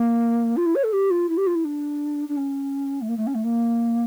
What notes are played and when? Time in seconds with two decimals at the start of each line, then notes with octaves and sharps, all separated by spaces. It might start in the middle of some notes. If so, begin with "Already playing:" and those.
Already playing: A#3
0.57 F4
0.66 E4
0.75 C#5
0.84 A4
0.93 G4
1.11 F4
1.29 E4
1.37 G4
1.47 F4
1.55 E4
1.65 D4
2.29 D4
2.37 C#4
3.02 A3
3.09 A#3
3.17 A3
3.27 C#4
3.35 A3
3.44 A#3